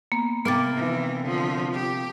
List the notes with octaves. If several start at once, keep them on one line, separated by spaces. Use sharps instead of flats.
A#3 B3
C3 A#3 B3 D6 A6
D#3 E3
D3 F3
G4